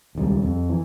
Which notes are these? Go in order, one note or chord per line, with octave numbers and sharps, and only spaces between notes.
D#1 C#2 C#3 G3
F2
E3